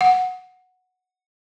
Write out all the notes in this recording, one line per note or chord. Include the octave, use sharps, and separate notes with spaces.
F#5